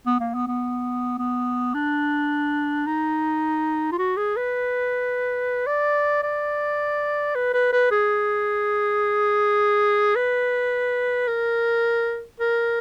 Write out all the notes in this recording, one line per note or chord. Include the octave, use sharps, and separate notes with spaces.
B3
A#3
B3
B3
B3
D4
D#4
F4
F#4
G#4
B4
D5
D5
B4
B4
B4
G#4
B4
A#4
A#4